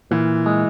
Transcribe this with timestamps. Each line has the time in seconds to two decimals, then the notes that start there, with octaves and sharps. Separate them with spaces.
0.11 A#2 E3
0.46 G#3